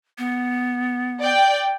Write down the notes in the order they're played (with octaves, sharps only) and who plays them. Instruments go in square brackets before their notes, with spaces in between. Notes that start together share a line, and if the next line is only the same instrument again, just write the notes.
[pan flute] B3
[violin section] D5 G5